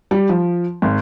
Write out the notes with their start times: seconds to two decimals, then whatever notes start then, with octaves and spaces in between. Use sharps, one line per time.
0.11 G3
0.29 F3
0.82 G#1